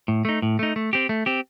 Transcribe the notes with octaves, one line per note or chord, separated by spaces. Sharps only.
A2
A3 D#4
A2
A3 D#4
A3
C4 G4
A3
C4 G4